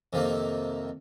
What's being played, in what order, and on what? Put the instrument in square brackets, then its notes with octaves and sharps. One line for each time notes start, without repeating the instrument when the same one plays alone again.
[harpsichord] F2 C3 D#3 A#3